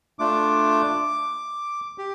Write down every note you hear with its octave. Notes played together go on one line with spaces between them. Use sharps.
A3 D4 F4 D6
G4